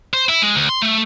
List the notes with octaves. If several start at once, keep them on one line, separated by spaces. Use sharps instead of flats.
C5
E4
G#3
D2
C6
A3